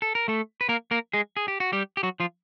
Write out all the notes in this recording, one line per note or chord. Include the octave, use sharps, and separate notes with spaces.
A4
A#4
A3 A4
B4
A#3 A#4
A#3 A#4
G#3 G#4
G#4
G4
F#4
G3 G4
G4
F#3 F#4
F3 F4